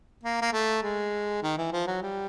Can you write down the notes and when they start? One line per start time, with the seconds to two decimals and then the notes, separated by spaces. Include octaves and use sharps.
0.23 A#3
0.41 A#3
0.53 A3
0.83 G#3
1.42 D#3
1.57 E3
1.72 F3
1.87 F#3
2.02 G3